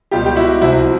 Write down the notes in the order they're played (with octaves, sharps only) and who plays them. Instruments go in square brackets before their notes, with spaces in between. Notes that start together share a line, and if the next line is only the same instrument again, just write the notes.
[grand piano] C#2 B2 G3 F4 G4
G4
E4 F#4
C2 C3 F3 E4 F#4